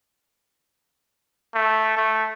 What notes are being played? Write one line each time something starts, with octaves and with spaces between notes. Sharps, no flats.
A3
A3